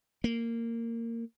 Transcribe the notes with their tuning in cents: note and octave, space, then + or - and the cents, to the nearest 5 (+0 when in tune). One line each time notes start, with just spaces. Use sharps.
A#3 -15